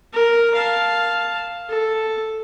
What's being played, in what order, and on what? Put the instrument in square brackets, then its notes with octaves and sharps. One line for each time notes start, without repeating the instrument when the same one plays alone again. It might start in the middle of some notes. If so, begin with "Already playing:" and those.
[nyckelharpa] A#4
F5 A5
A4